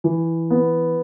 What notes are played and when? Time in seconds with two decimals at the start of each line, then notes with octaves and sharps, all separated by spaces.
0.04 E3
0.50 B3